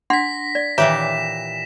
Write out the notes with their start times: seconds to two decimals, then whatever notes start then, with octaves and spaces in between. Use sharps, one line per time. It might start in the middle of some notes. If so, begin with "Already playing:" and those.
0.10 D4 F#5 C6 A#6 B6
0.55 D5
0.78 A#2 D#3 E3 G4 C#5 E5 E7